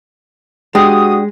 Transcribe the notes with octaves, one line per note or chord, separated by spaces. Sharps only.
G#3 D4 F#4 G4 D#6